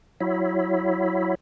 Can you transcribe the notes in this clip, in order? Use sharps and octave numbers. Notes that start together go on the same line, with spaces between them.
F#3 E4